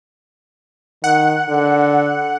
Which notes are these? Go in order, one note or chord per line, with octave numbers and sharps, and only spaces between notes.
D#3 F#5
D3